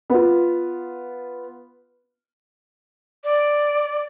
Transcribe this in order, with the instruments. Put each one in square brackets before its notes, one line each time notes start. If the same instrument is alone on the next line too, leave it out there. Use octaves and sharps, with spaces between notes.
[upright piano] B3 F4
[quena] D5